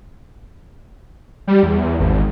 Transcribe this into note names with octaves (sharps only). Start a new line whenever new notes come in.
G3
E2
G#1